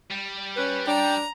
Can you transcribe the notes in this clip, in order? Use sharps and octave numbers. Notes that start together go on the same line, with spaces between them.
G3
C#4 B4
D4 G5 A#5